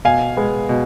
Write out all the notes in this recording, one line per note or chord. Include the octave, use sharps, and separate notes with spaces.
B2 F5 G#5
G#3 B3
B2